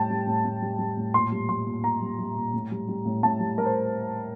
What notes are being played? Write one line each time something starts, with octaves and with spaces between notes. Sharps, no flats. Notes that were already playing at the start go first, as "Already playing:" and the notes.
Already playing: A2 G3 G5 A5
G3
A2
A2
G3
G3
A2
A#2 C6
G3
G3 C6
A#2
A#2 A#5
G3
G3
A#2
A2
G3
G3
A2
A2 A5
G3
G3 A#4
C5